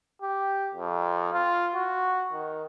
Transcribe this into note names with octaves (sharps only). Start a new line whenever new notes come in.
G4
F2
F4
F#4
D#3